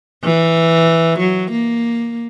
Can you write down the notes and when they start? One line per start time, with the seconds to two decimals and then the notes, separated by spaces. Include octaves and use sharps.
0.24 E3
1.19 F#3
1.51 A#3